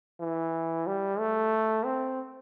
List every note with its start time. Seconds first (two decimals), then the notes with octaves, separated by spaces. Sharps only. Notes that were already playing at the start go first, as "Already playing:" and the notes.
0.20 E3
0.87 G3
1.19 A3
1.85 C4